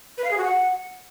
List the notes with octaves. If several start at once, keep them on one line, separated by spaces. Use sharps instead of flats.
B4
F5
G#4
F#4
F#5